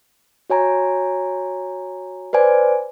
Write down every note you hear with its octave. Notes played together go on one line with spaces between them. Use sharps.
F#4 C#5 G#5 A#5
B4 C5 D5 G#5